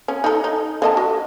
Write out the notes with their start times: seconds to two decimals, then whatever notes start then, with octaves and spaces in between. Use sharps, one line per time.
0.08 C#4
0.24 D#4 A4
0.44 D#4
0.82 D3 D#5 A5
0.97 F#4